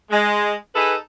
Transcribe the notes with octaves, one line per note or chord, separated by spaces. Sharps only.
G#3
D#4 G#4 A4 B4